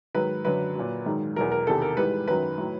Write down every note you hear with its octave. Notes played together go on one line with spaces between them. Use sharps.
G#2 D#3 F#3 B4
F#2 D3 F#3 B4
A#2 F#3
G#2 D#3 F#3
E2 B2 F#3 A#4
A#4
E2 C3 D#3 A4
A#4
G#2 E3 G3 B4
F#2 D#3 F#3 B4
A2 F#3